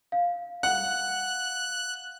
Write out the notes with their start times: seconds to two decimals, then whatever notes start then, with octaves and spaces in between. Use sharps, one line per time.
0.12 F5
0.63 F#5 F#6